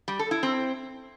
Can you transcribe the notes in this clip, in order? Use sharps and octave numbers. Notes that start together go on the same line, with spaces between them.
G3
A4
E4
C4